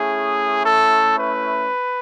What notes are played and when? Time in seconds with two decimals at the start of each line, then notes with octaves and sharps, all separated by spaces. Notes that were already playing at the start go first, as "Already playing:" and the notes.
Already playing: A3 C#4 E4 G#4
0.63 A4
1.18 B4